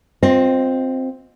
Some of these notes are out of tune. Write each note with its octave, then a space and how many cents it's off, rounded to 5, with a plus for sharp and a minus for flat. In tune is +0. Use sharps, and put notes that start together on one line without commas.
C4 +0 F4 +25 D#5 +0